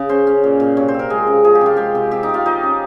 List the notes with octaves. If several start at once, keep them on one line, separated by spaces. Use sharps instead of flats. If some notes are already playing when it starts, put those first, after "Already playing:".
Already playing: C#3
C#4 C5
C#4
A#2
A#2
C3 C#5
C5
C4
A#4
G#3 G#4
C#3
F3 G#4
G4
C3 F4
G#3 G4
C3
C4 G4
D#4
C3
F4
F3 D#4
C#4